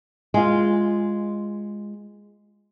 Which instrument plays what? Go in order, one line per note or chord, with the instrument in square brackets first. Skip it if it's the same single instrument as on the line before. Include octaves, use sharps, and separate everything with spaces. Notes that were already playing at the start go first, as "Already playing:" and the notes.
[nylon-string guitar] G#3 F4